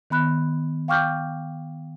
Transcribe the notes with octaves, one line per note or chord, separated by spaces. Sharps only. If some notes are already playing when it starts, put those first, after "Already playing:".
D#3 B3 B5 F#6
F5 G5 C#6 D6 F6 G6